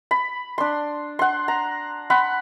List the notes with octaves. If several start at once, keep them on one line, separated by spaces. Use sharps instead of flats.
B5
D4 C6
F#5 C6
A#5
F#5 B5 C6